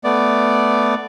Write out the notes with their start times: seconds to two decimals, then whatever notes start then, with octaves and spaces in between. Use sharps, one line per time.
0.04 A3 B3 D5